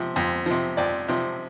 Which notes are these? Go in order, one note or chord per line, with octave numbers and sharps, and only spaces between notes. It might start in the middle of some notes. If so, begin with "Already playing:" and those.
Already playing: C3 F3
F2
C3 F3
F2 D5
C3 F3